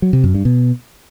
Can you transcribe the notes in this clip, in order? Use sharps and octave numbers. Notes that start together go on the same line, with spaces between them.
F#3
C3
F#2
G2
B2